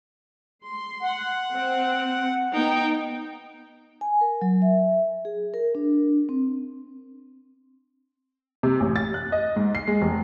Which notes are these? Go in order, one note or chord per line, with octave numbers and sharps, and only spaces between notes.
C6
F#5
C4
B3 D#4 G5
G#5
A#4
F#3
E5
G#4
A#4
D4
C4
C3
A1
A6
F#6
D#5
G#2
C7
G#3
F1